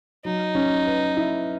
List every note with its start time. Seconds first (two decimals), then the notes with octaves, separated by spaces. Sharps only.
0.25 F#3 D#4
0.55 C#4
0.86 B4
1.17 E4